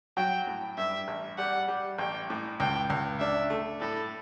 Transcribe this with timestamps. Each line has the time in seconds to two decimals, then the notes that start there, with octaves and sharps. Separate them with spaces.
0.17 F#3 G5
0.47 A2
0.77 G2 E5
1.08 A1
1.38 G3 F#5
1.68 G3
1.99 A1 G5
2.30 A2
2.60 C#2 G5
2.90 C#2
3.20 D4 E5
3.50 A3
3.81 A2 A4